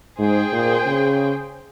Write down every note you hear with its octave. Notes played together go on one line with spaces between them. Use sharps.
G#2 G#4 C5 G5
A#2
C#3